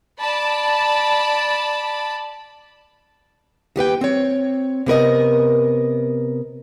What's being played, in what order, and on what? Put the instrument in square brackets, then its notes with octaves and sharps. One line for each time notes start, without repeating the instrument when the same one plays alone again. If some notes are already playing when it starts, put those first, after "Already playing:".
[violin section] D5 A5 B5
[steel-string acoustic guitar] D#2 G4 B4 G5
C4 C#5
C3 B3 A#4 D#5